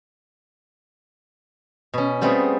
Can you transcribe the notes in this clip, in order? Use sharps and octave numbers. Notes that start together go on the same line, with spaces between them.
B2 C#4
G3 A3 B3 C4 F#4 G#4